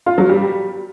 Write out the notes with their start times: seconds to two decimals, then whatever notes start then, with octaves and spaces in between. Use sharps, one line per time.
0.06 F4
0.18 F#3
0.29 G3